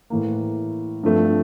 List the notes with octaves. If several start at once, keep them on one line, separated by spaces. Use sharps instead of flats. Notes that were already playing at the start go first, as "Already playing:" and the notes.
A2 E3 A#3
G2 F3 A3 C4